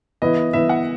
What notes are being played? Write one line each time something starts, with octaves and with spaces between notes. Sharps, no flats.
E3 B3 E4 D#5
E3 B3 E4 E5
F#5